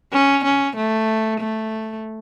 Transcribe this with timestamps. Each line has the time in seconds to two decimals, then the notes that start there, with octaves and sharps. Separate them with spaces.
0.13 C#4
0.44 C#4
0.76 A3
1.40 A3